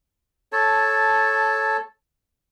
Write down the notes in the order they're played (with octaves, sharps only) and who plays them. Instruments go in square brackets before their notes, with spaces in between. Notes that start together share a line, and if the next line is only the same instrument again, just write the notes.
[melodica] A4 C#5 A5